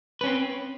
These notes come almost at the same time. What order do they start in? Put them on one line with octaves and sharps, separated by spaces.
B4 C#4 C4